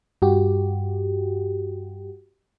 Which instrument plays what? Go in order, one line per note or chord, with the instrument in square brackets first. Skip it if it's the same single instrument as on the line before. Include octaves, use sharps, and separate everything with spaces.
[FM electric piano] G2 F#4 G4